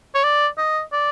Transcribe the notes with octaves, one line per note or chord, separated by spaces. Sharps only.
C#5
D5
D#5
D5